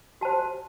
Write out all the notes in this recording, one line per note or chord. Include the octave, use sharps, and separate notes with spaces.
F#4 C5 A5